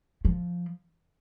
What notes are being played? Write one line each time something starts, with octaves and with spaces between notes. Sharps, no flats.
F3